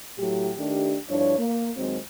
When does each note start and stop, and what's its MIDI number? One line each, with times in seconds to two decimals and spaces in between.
0.19 0.51 45
0.19 0.51 54
0.19 0.51 67
0.57 0.96 51
0.57 0.96 57
0.57 0.96 62
0.57 0.96 67
1.09 1.37 43
1.09 1.37 53
1.09 1.37 62
1.09 1.37 64
1.09 1.37 73
1.38 1.72 58
1.77 1.97 39
1.77 1.97 54
1.77 1.97 56
1.77 1.97 60